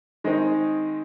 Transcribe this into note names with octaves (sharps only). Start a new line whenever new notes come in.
D#3 G#3 C4 D#4